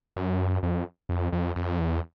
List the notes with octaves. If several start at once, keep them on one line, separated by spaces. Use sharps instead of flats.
F#2
F2
F2
F2
F2
E2